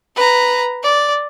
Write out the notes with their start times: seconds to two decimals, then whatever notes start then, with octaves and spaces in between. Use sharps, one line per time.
0.16 B4 A#5
0.83 D5